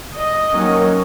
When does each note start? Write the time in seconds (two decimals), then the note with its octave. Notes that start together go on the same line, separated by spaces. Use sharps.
0.15 D#5
0.52 D#3 F#3 A#3 C#4